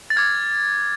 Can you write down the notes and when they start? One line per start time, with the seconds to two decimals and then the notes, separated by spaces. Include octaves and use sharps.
0.10 A6
0.16 D6 F6 G#6